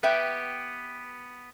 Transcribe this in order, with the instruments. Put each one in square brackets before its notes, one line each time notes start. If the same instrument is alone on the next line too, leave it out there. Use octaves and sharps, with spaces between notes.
[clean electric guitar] B3 G4 [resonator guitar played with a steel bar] B4 E5 G5